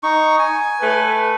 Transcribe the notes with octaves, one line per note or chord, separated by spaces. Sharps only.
D#4 C#6
G#5
A3 B4